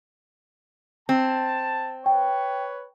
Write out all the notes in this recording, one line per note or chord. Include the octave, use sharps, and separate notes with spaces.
C4 A5
B4 C#5 G5